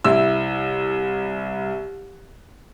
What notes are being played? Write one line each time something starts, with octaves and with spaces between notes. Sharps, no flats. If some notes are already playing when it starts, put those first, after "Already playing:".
C2 E4 E6